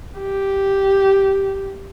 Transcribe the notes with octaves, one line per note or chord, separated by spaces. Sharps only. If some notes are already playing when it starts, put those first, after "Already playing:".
G4